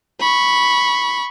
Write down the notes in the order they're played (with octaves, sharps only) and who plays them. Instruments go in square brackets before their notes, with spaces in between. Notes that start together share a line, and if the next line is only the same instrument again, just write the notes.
[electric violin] B5 C#6